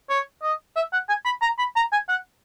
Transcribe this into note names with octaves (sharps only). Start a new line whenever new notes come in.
C#5
D#5
E5
F#5
G#5
B5
A#5
B5
A#5
G#5
F#5